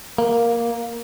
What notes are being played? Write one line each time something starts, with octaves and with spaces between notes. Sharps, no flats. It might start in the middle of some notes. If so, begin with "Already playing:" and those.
A#3